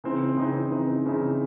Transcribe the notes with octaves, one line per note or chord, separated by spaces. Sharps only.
C#3 E3 C4 D#4
C#3 E3 C4 D#4
C#3 E3 C4 D#4
C#3 E3 C4 D#4